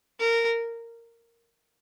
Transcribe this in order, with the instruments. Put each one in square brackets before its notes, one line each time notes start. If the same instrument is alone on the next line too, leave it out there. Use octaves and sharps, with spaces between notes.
[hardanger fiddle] A#4